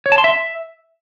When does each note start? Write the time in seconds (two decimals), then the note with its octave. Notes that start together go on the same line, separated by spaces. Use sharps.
0.06 C#5
0.12 A5
0.18 C6
0.24 E5